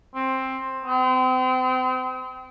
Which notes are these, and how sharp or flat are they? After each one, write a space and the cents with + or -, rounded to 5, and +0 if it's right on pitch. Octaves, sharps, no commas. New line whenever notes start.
C4 +10
C4 -35